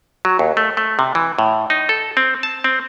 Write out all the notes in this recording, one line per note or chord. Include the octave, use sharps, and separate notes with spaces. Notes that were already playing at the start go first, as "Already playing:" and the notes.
F#3
D#2
A3
A3
C3
E3
A2
D#4
A4
C4
A5
C4